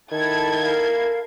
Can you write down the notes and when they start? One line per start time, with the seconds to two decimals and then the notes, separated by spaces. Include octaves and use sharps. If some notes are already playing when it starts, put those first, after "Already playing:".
0.12 D#3 E4 A4 G#6
0.60 A#4 F5